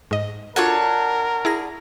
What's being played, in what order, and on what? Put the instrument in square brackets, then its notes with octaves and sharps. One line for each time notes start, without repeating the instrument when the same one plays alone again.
[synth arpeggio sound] G#2 D#5
[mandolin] D4 C#5 F#5 [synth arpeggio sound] F4 F#4 A4 [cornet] A#4
[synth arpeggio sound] E4 G#4 A#6